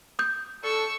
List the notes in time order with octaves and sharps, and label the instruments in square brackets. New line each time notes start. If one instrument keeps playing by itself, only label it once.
[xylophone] D#6 G6
[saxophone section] D4 A4 [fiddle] C#6 E6